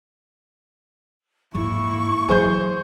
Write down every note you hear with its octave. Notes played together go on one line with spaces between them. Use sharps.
E2 G#2 A#3 E4 C#6
E3 F#3 G#4 C5 G6